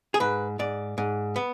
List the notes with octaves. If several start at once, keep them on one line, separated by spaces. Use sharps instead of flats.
G#4
G#2 B4
G#2 D5
G#2
B3